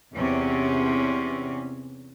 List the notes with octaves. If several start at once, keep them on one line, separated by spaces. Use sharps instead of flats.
E2 C3 C#4